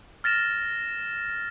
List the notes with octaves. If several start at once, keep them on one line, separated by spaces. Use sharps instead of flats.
F6 A6 A#6 E7